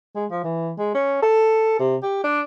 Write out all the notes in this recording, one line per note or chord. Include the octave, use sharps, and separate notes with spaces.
G#3
F3
E3
G#3
C#4
A4
C3
G4
D4